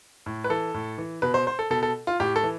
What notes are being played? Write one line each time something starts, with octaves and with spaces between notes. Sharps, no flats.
A2
B4
E3 A4
A2
E3
B2 B4
C5
C5
A4
B2 A4
A4
F4
A2 G4
A4
E3